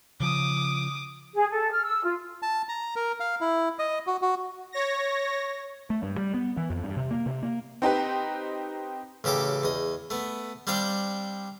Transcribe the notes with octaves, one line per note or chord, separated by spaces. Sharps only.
C#3 F3 D6 D#6
G#4
A4
F6
E6
F4
A5
A#5
A#4
F5
E4
D#5
F#4
F#4
C#5 A#6
A3
G2
G3
B3
E3
F2
G2
C3
A#3
C3
A#3
C4 D#4 G4 B4
A1 C#3 G4 A4 D6
E2 D#5
A3 B3
G3 C4 D4 F5 G5